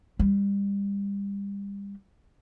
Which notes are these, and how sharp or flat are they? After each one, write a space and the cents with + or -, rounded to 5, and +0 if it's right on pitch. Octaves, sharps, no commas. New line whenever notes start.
G3 +30